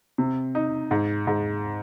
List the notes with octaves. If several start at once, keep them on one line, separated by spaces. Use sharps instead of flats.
C3
D#4
G#2
G#2